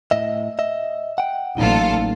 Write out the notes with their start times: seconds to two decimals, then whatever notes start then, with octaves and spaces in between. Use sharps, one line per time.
0.11 A2 D#5 E5
0.59 D#5 E5
1.18 F#5 G5
1.58 A1 F#3 A#3 D#4 F4 A4